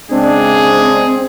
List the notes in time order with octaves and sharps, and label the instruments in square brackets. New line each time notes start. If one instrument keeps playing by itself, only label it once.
[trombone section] C#3 G#3 D4 [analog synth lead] C4 [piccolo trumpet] G#4